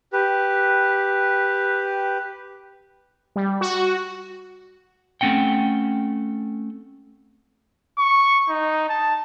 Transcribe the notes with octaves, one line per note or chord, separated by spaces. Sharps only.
G4 B4
G3
F#4
A3 C4 C#4 F#5 G5
C#6
D#4
A5